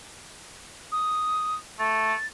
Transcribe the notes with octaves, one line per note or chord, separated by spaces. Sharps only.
D#6
A3 A6